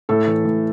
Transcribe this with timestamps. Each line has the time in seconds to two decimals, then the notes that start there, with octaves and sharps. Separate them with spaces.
0.09 A2 A4
0.27 E3
0.45 A2